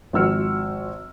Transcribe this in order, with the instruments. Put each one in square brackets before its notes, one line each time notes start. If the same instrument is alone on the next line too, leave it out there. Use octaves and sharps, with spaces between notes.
[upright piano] G#1 F3 F#4 E6 F6 C#7